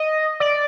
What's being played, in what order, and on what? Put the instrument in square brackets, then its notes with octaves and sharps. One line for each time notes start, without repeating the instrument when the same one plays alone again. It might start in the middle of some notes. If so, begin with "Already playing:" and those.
Already playing: [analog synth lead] D#5
D5